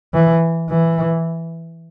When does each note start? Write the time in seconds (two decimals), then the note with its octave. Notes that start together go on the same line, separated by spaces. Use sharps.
0.14 E3
0.70 E3